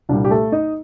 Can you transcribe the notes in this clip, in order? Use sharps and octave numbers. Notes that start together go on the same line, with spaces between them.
C2 A#2 G3 D4
G4
A3 A4
D#4 D#5